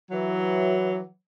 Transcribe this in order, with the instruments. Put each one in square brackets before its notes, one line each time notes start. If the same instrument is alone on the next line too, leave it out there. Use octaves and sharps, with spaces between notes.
[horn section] E3 F#3